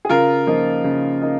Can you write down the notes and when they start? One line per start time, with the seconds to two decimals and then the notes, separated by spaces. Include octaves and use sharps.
0.05 G#4
0.09 C#3 F4 A#4
0.47 F3 A#3 D#4
0.84 C#3
1.22 A#3 D#4